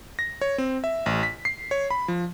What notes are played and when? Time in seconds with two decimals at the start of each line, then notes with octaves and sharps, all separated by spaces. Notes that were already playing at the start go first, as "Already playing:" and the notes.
0.19 A#6
0.41 C#5
0.58 C4
0.84 E5
1.06 A1
1.23 B6
1.45 C7
1.71 C#5
1.91 B5
2.08 F3